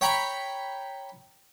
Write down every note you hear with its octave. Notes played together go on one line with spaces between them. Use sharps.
C#5 G5 A#5 B5 C#6